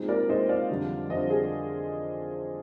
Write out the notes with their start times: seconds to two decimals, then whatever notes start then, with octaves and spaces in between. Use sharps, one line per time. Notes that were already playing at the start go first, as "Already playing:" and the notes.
Already playing: A#2 G#3 C4 D#4
0.08 A#4 D5
0.29 A#2 G#3 C4 D#4 C5 D#5
0.49 D5 F5
0.69 F2 D3 G3 D4
1.10 F2 D3 G3 D4 C5 D#5
1.30 G#4